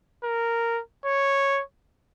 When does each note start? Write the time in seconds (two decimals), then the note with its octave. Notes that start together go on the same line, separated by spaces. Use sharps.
0.24 A#4
1.05 C#5